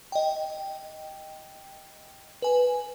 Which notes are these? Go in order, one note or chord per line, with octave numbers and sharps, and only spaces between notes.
D#5 G5
B4 G#5